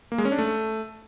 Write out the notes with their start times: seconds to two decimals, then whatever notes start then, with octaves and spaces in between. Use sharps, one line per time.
0.12 A#3
0.18 G#3
0.25 C#4
0.32 D4
0.39 A3